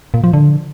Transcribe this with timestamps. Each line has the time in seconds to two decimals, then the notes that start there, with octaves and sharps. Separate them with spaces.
0.14 A#2
0.24 F3
0.33 D3